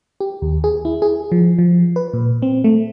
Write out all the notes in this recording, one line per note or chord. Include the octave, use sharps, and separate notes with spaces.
G4
D#2
G#4
E4
G#4
F3
F3
B4
A#2
C4
A3